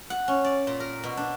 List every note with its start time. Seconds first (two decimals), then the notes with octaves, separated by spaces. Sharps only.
0.10 F#5
0.28 C#4
0.44 D5
0.67 A#2
0.80 A#4
1.03 B2
1.17 D4